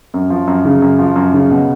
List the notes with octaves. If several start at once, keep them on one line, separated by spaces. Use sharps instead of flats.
F#2
F3
F#2
C#3
F#2
F3
F#2
C#3
B2